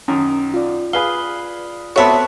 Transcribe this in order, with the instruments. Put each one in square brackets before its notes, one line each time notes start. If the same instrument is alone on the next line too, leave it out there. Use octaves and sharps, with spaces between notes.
[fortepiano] F#2 D#3 [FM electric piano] C#4
[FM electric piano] F4 D5
[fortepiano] G#4 B4 F5 [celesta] G7
[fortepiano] B3 C4 F#4 [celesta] A4 A5 [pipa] C#5 E5